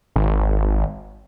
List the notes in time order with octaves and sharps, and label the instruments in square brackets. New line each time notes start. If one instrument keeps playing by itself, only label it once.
[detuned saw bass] G#1